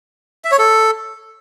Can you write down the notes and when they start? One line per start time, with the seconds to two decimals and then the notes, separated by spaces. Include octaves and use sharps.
0.45 E5
0.52 C#5
0.59 A4